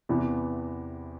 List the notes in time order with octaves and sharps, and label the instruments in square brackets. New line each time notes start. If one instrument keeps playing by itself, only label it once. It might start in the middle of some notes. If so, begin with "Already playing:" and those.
[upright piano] E2 C3 E3 B3